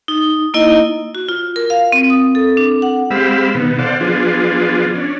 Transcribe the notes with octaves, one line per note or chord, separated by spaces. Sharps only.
D#4
A#3 D#4 E4 D#5
F#4
F4
A#4
F5
C4
D#6
A4
D4
F#5
G#3 C4 G4 F5 B5 E6
B2 D#3 B3
A4 C5 D5 F5 F#5
F3 B3 D4 F4 G#4
C#4 D4